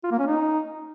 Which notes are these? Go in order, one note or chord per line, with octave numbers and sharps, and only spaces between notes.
F4
A#3
C#4
D#4